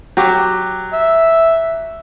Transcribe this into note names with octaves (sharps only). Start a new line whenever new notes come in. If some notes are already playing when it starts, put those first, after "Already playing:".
F#3 G4 D6
E5